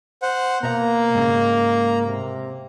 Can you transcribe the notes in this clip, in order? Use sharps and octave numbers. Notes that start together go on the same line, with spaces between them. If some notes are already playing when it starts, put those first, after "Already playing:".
C5 F#5
B2 A#3 E5 F5 A#5
G#2 C#3
C3